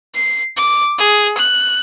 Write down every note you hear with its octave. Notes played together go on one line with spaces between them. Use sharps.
C7
D6
G#4
F#6